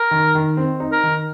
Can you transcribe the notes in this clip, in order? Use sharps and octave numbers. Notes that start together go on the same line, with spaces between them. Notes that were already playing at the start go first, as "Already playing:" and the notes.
Already playing: A#4
D#3
D#3
C4
D#4
A#4
D#3